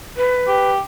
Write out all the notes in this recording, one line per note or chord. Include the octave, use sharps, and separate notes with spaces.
B4
G4